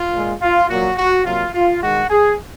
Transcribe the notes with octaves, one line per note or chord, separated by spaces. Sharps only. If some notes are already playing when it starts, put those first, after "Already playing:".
Already playing: F4
A#2 G#3
F4
A#2 F#3 A#3 F#4
F#4
C3 F#3 A#3 F4
F4
G#2 D#3 G#3 F#4
G#4